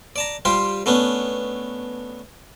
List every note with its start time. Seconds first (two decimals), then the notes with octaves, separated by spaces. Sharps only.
0.16 D5 A5 A#5
0.45 G3 F4 G4 C5
0.86 A3 B3 C#4 D4